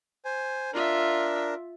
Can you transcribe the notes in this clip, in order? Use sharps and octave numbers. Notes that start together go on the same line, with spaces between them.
C5 G#5
D4 F4 A#4 E5